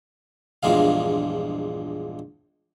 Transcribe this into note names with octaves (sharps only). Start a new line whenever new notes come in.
A#1 E2 G2 F3 G#3 F5